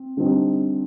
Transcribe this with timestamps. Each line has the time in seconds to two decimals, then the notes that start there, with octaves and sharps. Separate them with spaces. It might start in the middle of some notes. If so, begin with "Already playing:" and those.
Already playing: C4
0.17 D3 G3 C4 D#4